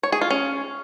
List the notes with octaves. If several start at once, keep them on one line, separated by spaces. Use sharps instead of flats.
C#5
G#4
F4
C#4